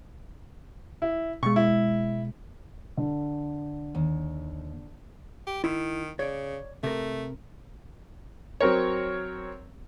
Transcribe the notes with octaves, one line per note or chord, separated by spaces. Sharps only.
E4
B2 G#3 C#6
E4
D3
D#2
G4
D#3 E4
C#3 C#5 D5
C3 A3 A#4
F#3 C4 A#4 C#5